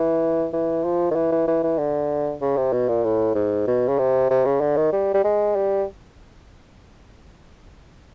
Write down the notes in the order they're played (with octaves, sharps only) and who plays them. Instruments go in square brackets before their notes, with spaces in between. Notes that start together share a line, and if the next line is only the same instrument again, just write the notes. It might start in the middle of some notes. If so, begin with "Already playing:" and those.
Already playing: [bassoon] E3
E3
F3
D#3
E3
E3
E3
E3
D3
C#3
C3
B2
A#2
A2
G#2
B2
C#3
C3
C3
C#3
D3
D#3
G3
G3
G#3
G3